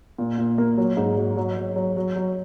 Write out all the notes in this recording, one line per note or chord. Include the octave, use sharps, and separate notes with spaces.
A#2
A#2
A#3
F#3
G#2
F#3
F#3
F#3
F#3
F#3
F#3